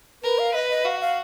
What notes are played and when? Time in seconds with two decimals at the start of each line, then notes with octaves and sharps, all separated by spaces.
0.23 A#4 B4
0.39 F5
0.54 B4 D#5
0.70 D#5
0.85 F#4 F5
1.00 F5